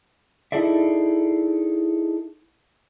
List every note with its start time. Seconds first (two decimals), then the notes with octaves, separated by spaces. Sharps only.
0.52 D#4 E4 G#4 A4 D5 E5